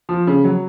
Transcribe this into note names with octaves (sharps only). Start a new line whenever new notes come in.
F3
C#3
F#3